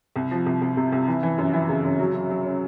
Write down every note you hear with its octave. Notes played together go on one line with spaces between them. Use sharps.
C2
F3
C2
C2
C3
C2
E3
E3
F#2
E3
C#3
F#2
F#3
F#3
F#3
C#4